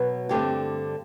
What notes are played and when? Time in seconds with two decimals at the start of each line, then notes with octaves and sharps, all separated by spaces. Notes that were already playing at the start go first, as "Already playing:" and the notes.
Already playing: B2 F#3 B3
0.29 G2 D3 A3 C4 G4